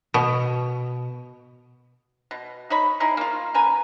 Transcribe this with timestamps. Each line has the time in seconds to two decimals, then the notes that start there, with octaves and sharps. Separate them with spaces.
0.14 B2
2.31 B2
2.70 D#4 C#5 B5
3.00 D#4 E4 G#4
3.17 A#3 F4
3.54 C#4 A#4 B4 G#5